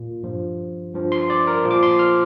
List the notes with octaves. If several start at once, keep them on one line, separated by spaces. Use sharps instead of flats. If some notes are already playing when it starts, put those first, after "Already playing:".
Already playing: A#2
G2 F3
G2 F3
C6
D5
A#4
A#2 F3
D6
C6
F6